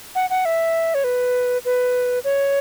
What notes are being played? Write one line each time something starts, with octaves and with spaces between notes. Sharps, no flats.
F#5
F#5
E5
C#5
B4
B4
C#5